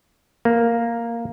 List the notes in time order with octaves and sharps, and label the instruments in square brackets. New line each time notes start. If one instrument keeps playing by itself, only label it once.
[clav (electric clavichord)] A#3